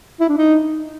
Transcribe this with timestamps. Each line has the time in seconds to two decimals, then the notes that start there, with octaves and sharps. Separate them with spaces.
0.20 E4
0.29 D4
0.37 D#4